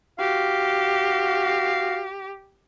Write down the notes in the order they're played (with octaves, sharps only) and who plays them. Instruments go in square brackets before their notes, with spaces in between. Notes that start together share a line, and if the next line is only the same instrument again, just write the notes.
[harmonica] F#4 F5 [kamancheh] G4